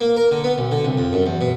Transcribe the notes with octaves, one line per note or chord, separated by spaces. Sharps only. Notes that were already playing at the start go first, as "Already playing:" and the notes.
A#3
A#4
D3
B3
B1
D3
C2
F2
F#2
E2
B2